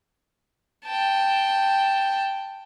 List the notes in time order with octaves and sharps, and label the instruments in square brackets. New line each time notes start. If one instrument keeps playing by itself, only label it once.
[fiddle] G5 A5